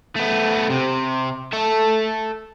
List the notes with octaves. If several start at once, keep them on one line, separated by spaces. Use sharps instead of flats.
A3 B3
C3
A4 E5